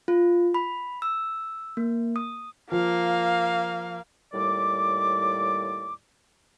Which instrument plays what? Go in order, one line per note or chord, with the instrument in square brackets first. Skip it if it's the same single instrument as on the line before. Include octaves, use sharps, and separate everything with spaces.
[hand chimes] F4
B5
E6
A#3
D#6
[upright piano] F3 [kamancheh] A#3 F5
[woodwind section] D#2 A2 G3 D5 D6